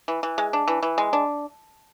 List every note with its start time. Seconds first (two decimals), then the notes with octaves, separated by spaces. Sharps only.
0.08 E3
0.23 E3
0.38 G#3
0.53 D4
0.68 E3
0.83 E3
0.98 G#3
1.13 D4